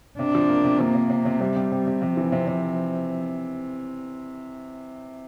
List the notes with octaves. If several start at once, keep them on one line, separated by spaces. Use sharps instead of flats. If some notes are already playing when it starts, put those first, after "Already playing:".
C3 D4
F3
A#3
C3
F3 A#3
C3
C3
C3
C3 G3
C3
C3
C3
C3 F3
E3
C3
C3